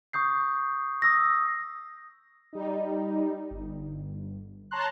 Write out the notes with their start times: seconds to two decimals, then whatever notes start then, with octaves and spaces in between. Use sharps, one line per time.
0.13 C#6 D#6 G6 C7
1.02 D#6 E6 A#6
2.53 G3 D#4
3.51 G1
4.71 C#5 A5 A#5 C6 F#6